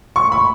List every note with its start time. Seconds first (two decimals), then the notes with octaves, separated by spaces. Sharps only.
0.16 C#6
0.32 B5